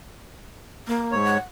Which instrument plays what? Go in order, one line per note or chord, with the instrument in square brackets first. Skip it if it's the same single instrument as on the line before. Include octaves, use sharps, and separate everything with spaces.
[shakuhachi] A#3
[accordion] G#2 C#5
[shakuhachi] F#5